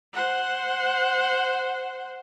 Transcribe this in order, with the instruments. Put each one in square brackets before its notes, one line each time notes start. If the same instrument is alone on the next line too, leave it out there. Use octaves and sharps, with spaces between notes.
[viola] C5 F#5